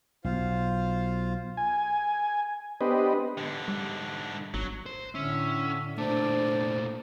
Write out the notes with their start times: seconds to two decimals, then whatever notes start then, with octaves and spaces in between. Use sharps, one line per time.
0.25 B1 F4 C5 F5
1.57 G#5
2.81 B3 D4 G4 B4 C5 D#5
3.38 G#2 D3
3.68 G3
4.54 G#1 F#3
4.86 C5
5.15 A2 D3 C#4 E5
5.98 A#2 A3 D4 C5 D5